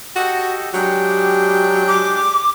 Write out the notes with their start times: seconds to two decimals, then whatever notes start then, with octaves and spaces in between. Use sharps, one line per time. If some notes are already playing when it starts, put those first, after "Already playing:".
0.16 F#4 G4 A4 D#5
0.74 F#3 G#3 D4 G4 G5
1.88 D6